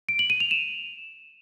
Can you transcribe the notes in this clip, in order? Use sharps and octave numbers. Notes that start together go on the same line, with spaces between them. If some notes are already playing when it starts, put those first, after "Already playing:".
D7
F#7
D#7
F7
E7